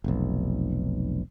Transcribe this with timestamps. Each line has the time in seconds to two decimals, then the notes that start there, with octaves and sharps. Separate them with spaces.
0.04 F1 B1